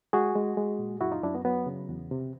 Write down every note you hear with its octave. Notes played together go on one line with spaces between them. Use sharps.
G#3 F#4 G#4
G#3
G#3
A#2
F#2 E4 F#4
D#4 F4
F#2 D4 E4
B3
F#3 B3
C#3
E2
C3